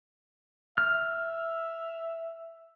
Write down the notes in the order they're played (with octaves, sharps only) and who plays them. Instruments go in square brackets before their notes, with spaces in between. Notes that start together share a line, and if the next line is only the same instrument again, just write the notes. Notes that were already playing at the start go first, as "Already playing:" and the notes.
[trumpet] E5 [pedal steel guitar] F6